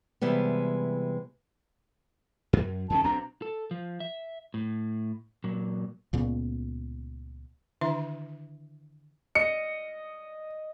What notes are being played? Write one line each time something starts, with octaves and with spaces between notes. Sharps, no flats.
C3 E3 G3 G#3 B3
F#2
F2 D#3 C#4 A5
B1 C4 D4 A#5
A4
F3
E5
A2
A#2 F#3
C#2 A#2 C#3 B3
D3 D#3 D4 E4 E5 C6
D#5 C#7